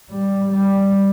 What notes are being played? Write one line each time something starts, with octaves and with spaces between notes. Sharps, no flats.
G3
G3